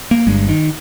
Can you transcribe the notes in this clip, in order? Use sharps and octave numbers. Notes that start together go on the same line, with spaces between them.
A#3
G1 G2 G#3
D#3